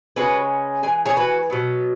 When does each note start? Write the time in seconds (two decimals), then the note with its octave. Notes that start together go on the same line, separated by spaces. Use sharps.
0.16 C#3 G#3 C#4 F#4 B4
0.83 E3 G#3 G#5
1.06 G#4 C#5
1.16 F#4 B4
1.50 B2 F#3 B3